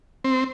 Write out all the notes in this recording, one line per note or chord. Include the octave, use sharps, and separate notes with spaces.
C4